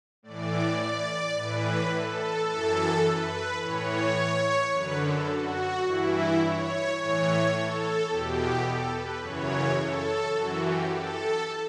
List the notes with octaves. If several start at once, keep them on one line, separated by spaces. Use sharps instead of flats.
A2 E3 D5
D5
A2 E3 B4
A4
F#2 E3 A4
B4
A2 E3 C#5
F#2 D3 B4
A4
F#4
G2 E3 E4
C#5
A2 E3 C#5
A4
E2 B2 G4
A4
B4
F#2 C#3 E3 C#5
A4
F#2 E3 F#4
G4
A4